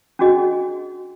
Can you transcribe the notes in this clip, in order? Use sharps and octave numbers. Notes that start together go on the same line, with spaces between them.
C#4 D4 F#4 G#4 D#5